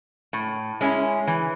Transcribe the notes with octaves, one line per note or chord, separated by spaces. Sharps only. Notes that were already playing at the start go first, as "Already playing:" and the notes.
A2
G#3 C#4 E4
E3